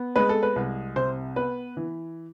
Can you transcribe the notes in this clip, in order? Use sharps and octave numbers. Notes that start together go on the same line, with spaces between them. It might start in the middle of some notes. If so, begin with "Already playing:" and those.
Already playing: B3
G#3 B4
A4
B4
C2
C3 C5
B3 B4
E3